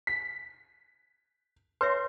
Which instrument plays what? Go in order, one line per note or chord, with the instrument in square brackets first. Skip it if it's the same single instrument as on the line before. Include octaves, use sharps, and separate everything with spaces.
[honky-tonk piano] B6
[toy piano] B4 C#5 E5 [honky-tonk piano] C6